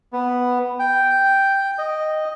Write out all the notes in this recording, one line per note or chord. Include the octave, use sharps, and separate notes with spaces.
B3
G5
D#5